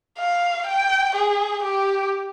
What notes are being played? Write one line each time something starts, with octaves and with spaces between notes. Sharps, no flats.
F5
G5
G#4
G4